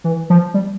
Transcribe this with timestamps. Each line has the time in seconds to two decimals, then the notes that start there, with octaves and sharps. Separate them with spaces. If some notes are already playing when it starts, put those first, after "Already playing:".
0.04 E3
0.30 F3
0.54 G3